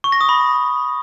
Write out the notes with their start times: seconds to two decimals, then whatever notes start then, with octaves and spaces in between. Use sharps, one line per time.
0.04 C#6
0.12 A#6
0.21 D#6
0.29 B5